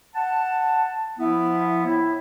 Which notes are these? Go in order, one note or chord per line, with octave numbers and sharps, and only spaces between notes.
F#5 A5
F3 B3 E4
A2 E4 E5